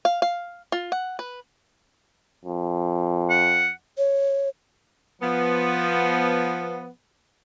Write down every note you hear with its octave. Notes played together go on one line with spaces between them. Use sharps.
F5
F5
F4
F#5
B4
F2
F#5
C#5
F3 B3